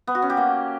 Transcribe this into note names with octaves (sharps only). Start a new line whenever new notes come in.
B3
F#4
C#4
G4
A#3